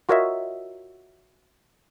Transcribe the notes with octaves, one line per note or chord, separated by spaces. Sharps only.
F4 F#4 A#4 C#5 D#5 E5